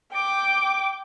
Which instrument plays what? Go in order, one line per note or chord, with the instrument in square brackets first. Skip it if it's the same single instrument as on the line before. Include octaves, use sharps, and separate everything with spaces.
[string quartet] G5 D6